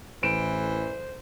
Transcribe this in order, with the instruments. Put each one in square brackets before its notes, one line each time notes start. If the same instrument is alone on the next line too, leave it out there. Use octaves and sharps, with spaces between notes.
[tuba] A1 [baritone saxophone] E3 [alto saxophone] C5 [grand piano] D7 E7